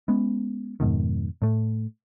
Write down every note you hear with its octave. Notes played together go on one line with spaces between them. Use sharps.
G#3 B3 C#4
F2 G#2 B2 D#3
A2 A3